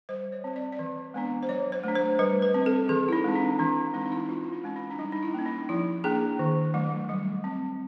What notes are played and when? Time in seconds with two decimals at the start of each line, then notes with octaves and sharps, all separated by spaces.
0.09 G3 C5
0.32 C#5
0.44 C4
0.56 D5
0.72 D5
0.79 E3
1.14 G#3 B3 D4
1.43 C5
1.49 F#3 C#5
1.72 C5
1.84 A3 D4
1.95 C5
2.19 G3 B4
2.42 B4
2.54 C4
2.66 A4
2.89 E3 G#4
3.08 E4
3.13 D#4
3.24 G#3 C4
3.35 D4
3.59 E3 D4
3.77 D4
3.94 G#3 C4 D#4
4.06 D#4
4.12 E4
4.29 E3 F4
4.44 E4
4.52 D#4
4.64 G#3 C#4
4.76 D#4
4.90 D4
4.99 G3 D#4
5.12 D#4
5.23 E4
5.34 A#3 C#4
5.46 D#4
5.69 F3 E4
6.04 A#3 D4 G#4
6.39 D#3
6.74 F#3 A3
7.09 G3
7.44 C4